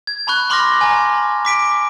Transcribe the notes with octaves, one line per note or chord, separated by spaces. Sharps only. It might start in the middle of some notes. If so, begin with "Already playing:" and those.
G#6
A5 B5 C#6 F#6
B5 C6 D6 F6 F#6 A#6
G#5 A#5 D6
D6 B6 D7